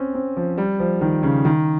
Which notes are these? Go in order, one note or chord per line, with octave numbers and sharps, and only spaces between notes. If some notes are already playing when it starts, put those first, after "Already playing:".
Already playing: C4 C#4
C4
F3
G3
F3
D#3
C#3
D#3